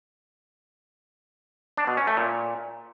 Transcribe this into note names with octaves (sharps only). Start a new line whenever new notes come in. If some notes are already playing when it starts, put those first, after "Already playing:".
D4
B2
C#4
A3
A#2